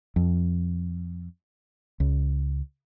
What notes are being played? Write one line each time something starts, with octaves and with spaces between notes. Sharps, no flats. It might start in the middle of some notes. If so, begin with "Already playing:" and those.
F2
C#2